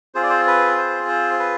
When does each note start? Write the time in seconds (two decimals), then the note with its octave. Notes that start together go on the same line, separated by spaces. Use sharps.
0.15 C4 F4 G#4 C5
0.23 D5
0.30 C5
0.47 B4
0.78 C5
1.08 C5
1.39 B4